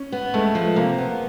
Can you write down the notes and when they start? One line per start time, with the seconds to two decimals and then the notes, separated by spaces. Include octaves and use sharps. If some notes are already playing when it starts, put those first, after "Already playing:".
Already playing: C#4
0.12 B3
0.34 G#3 A3
0.55 F3
0.76 C3 A#3
0.98 B3